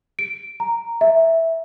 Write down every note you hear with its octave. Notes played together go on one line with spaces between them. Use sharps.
D7
A#5
E5